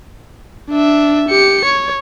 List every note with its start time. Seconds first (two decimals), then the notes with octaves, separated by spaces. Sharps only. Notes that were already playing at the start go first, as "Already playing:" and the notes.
0.70 D4 E5
1.29 G4 C#7
1.65 C#5